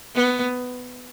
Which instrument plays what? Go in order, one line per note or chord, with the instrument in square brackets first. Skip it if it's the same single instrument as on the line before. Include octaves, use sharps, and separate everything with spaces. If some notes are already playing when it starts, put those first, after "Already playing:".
[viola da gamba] B3